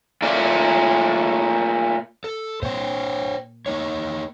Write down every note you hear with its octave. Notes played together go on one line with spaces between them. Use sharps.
A#2 A3 F4 D5
A4
A#2 C5 C#5 G5
A#3 D#4 C#5